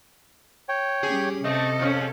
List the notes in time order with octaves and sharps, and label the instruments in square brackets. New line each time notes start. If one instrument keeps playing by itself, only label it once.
[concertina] C#5 G5
[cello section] G3 C#4 G4 [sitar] G#4
[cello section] C3 A4 [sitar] A3 C4 [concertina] D#5
[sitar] F2 F3 C#4